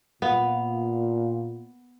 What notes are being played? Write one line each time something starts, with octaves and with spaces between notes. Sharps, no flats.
A#2 B3 F5